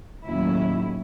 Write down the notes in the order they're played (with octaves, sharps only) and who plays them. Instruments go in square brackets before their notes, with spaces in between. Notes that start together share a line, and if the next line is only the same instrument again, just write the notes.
[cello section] D#2 A2 F#3 C#4 E4